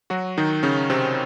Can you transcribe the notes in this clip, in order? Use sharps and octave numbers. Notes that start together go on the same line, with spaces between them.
F#3 F#4
D#3 D#4
C#3 C#4
C3 C4